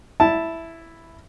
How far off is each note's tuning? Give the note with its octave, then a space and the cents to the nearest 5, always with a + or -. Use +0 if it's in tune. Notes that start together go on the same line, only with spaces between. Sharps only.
E4 +0 A5 +0